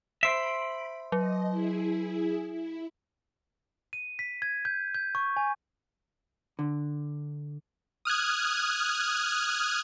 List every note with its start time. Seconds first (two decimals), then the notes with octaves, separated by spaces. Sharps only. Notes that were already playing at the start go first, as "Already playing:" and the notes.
0.23 C5 E5 B5 D7
1.12 F#3 D#5
1.50 E4 G#4
2.52 E4
3.93 D#7
4.19 B6
4.42 G#6
4.65 G6
4.95 G6
5.15 C#6
5.37 G#5
6.59 D3
8.05 D#6 F6 F#6 G#6